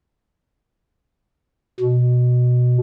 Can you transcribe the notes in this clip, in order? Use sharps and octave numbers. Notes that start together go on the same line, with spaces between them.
B2